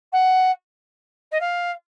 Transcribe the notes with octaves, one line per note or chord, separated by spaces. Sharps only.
F#5
D#5
F5